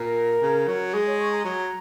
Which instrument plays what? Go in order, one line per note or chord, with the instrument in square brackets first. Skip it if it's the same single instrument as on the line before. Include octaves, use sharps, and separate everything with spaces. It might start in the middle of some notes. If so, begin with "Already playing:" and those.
Already playing: [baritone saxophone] A#2 [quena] A#4
[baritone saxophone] C#3
F#3
[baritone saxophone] G#3 [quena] G#4
[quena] C#5
C#6
A#5
[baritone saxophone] F#3